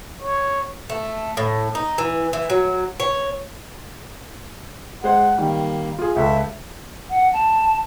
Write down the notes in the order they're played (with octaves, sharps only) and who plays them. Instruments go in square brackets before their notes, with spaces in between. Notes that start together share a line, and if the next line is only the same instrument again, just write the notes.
[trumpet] C#5
[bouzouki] A3
A2
D#4
E3
E3
F#3
C#5
[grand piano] G#3 C5 [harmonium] F#5
[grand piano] D#3 G3 [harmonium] A#3
[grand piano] F4 G#4
[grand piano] C#2 A4 [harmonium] E5
[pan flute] F#5
A5